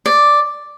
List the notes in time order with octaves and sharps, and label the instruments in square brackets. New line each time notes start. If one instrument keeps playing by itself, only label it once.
[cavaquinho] D5